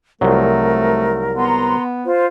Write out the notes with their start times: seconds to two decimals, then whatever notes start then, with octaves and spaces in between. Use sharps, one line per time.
0.21 C2 F3 F#3 A3 A#4
1.36 B3 F#5 A#5 C6
2.05 F4 C5